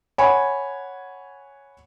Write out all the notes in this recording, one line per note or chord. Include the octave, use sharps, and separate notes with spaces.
C#5 F#5 G#5 B5